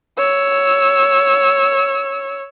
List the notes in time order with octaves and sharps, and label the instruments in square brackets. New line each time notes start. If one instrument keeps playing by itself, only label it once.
[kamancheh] C#5 E6